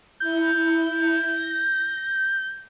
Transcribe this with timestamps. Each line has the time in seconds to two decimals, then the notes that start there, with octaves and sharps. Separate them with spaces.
0.20 E4 G6
1.32 A#6